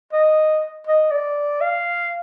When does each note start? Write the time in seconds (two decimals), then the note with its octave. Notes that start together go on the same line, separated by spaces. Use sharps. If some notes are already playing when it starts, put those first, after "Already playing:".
0.13 D#5
0.87 D#5
1.11 D5
1.61 F5